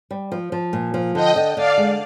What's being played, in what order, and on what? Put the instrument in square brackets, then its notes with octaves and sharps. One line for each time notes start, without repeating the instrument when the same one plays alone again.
[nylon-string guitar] G3
F3
F3
A#2
F3
[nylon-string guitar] D3 [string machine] D#5 G5
[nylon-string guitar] D3
[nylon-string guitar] D3 [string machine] D5 F5
[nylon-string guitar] G#3